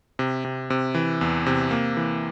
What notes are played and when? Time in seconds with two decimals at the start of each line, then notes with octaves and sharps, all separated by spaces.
0.19 C3
0.45 C3
0.70 C3
0.95 E3
1.21 E2
1.46 C3
1.71 A#3
1.97 E3